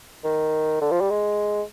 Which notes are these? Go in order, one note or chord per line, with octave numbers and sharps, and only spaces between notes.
D#3
D3
F3
G3
G#3